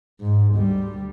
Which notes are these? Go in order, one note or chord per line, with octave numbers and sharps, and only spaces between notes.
G#2
D2 G3